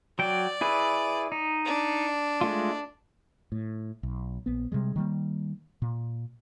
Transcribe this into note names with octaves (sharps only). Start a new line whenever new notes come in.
F#3 D5 G5
E4 G#4 B4
D#4
D4
G#3 A3 F4
A2
B1
A#1 B3
C3 G3 G#3
D#3 G3 A#3
A#2